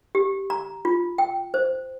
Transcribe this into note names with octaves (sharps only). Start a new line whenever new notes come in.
G4
A#5
F4
G5
C5